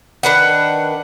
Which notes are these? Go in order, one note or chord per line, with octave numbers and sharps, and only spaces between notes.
D#3 D4 B4 F#5